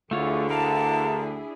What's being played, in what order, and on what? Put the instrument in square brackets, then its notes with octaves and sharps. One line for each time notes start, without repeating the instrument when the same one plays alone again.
[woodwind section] D2 D3 [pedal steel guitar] A3 F4 C#5 [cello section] D4 E4 G#4
[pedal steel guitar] A#4 F5 [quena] A5